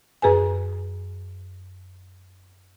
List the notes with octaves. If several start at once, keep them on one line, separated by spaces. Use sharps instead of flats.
F#2 G#4 B4 G#5